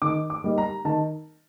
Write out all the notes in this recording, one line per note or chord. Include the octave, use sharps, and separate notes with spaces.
D#3 D6
D6
G3 A#3 D#4
A#5
D#3 A5